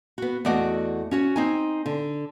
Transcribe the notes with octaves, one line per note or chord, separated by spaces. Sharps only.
B3 F#4
E2 A3 F#4 D5 D#5 F#5
C#4 F#4 C#5
C4 D#4 G#5
D3